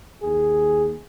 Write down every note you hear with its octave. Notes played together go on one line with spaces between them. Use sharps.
D#2 G#4